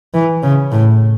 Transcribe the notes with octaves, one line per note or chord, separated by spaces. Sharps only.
E3
C#3
A2